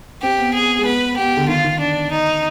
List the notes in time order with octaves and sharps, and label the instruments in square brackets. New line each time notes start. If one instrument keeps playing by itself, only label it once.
[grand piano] C4 [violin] G4
[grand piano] B3
[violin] G#4
[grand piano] G#3
[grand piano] B3 [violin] B4
[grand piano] B3 [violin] G4
[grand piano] D3
[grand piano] D#3 [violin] F4
[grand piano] D#3
[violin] D4
D#4